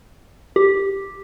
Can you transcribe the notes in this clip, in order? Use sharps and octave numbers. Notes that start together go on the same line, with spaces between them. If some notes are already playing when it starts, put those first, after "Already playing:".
G4